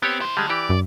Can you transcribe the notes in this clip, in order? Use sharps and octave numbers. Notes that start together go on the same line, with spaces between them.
B3 C4 G4 C#5
E4 C5
D3 G3 G#3
E3 G4 D5
F#2